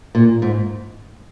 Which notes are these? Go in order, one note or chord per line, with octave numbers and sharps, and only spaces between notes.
A#2
G#2